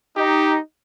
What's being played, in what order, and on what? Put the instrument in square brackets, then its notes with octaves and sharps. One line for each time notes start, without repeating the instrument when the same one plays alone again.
[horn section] D#4 [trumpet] G4